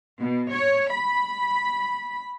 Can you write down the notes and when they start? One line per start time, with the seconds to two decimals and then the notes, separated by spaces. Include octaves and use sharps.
0.22 B2
0.53 C#5
0.91 B5